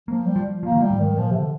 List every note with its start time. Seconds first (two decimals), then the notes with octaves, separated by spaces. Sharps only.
0.08 F3 A#3
0.26 G3
0.36 F3
0.63 F3 A#3
0.72 D#3
0.80 F3 G3
0.90 G#2
1.00 D#3
1.18 A#2 F3
1.31 C3
1.36 D3